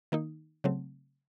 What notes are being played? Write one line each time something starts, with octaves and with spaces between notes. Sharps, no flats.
D#3 A#3 D#4
C#3 F#3 A3 C4